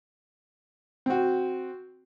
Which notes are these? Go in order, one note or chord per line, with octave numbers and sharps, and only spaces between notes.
C4 F#4